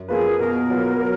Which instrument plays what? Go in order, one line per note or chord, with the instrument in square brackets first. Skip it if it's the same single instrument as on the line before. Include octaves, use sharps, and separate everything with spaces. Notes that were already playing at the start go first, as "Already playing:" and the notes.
Already playing: [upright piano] F#2
[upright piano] F3 A#3 F4 B4 [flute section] G#4
[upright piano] B2 [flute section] A#4
[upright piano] F#3 B3 F4
F#3